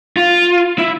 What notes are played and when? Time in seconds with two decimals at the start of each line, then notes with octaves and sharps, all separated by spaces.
0.17 F4
0.78 E4